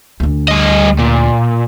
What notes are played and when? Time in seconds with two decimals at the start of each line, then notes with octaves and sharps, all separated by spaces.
0.20 D2 D3
0.48 G3 D#5
0.99 A#2